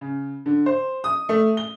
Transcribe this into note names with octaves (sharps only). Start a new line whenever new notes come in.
C#3
D3
C5
D#6
A3
G7